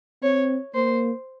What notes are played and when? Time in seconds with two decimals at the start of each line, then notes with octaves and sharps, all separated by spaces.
0.23 C4 C#5
0.75 A#3 C5